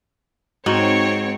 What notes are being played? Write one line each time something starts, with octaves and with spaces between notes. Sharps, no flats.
G#2 C4 D#4 F#4 C#5